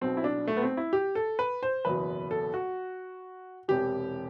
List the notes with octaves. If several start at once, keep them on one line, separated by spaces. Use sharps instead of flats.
B1 B2 C4
E4
D4
A3
B3
C4
E4
G4
A4
B4
C5
F#1 E2 B2 B4
A4
F#4
E1 E2 C3 E3 G4